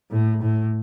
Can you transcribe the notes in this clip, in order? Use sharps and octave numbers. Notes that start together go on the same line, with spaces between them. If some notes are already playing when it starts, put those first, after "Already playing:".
A2
A2